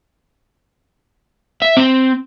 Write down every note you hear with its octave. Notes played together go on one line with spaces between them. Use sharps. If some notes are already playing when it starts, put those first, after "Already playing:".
E5
C4